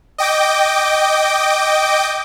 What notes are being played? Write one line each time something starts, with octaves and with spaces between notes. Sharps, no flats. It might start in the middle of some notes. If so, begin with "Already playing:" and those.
D#5 G5 D6